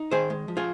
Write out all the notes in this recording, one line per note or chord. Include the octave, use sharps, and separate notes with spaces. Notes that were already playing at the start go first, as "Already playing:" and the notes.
Already playing: D#4
D#3 G#4 C5
G#3
F3
F4 G#4